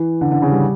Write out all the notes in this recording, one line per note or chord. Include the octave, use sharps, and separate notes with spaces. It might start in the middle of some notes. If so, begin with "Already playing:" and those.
Already playing: E3
D3
D3
C#3
G3